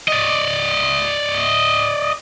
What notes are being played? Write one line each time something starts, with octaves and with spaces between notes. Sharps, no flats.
D5 D#5